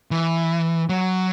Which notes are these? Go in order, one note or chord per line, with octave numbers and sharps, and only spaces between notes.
E3
F#3